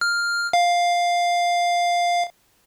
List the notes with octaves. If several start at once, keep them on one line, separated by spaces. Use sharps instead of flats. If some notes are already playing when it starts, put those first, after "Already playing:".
F6
F5